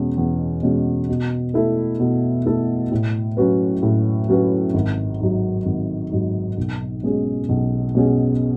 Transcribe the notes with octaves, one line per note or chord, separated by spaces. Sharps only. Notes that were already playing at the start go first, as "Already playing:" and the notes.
Already playing: E2 B2 G#3 C#4
E2
B2 G#3 C#4
B2
A3 E4 A4
B2
A3 E4 A4
A2
F#3 C#4 F#4 B4
A2
F#3 C#4 F#4 B4
G#1
G#2 F#3
G#1
G#2 F#3
B1
B2 G#3 C#4 G#4
B1
B2 G#3 C#4 G#4